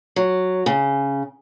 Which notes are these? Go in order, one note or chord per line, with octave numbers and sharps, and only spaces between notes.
F#3
C#3